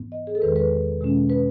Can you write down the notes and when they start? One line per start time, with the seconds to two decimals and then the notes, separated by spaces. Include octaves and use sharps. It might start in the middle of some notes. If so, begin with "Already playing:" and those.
Already playing: G#2 E3 B3
0.12 D#5
0.27 G#4
0.35 A4
0.42 E2 D#3 G#3 B4
0.56 B4
1.01 B2 G#3 C#4
1.30 B4